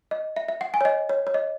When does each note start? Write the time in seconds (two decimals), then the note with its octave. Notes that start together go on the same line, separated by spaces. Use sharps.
0.11 D#5
0.36 E5
0.48 E5
0.61 F#5
0.74 G#5
0.81 C#5
0.85 D#5
1.09 C#5
1.27 C#5
1.34 D#5